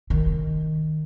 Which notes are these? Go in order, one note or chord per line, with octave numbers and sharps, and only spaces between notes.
D#3